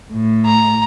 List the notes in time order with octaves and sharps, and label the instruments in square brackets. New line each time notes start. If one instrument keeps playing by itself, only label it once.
[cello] A2
[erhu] A#5